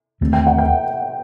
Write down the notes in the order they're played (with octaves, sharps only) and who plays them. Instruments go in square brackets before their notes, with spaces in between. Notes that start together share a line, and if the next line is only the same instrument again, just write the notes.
[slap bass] D#2 D3 A3 C4
[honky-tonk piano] G5
F#5
G5